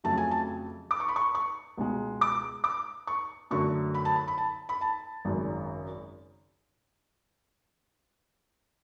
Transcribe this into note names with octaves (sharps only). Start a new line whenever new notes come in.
F2 C#3 F#3 A3 A5
G#5
A5
D6
C#6
B5
C#6
C#6
C#2 B2 G#3
D6
D6
C#6
F#2 D3 F#3 A3 C#6
B5
A5
B5
B5
A5
B5
A5
G#1 F#2 C#3